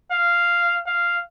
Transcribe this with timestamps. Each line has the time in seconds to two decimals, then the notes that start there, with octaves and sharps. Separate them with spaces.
0.12 F5
0.86 F5